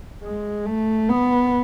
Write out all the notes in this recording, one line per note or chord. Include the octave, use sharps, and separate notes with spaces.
G#3
A3
B3